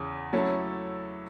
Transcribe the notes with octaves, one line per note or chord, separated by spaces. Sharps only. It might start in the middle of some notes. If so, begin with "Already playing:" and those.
Already playing: E2 C#3
F#3 A3 C#4 E4 A4